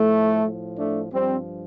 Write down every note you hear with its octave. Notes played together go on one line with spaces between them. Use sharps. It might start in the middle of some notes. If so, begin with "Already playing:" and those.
Already playing: A2 F3 A3
A2 F3
A3 D4
G2 F3 G3 C4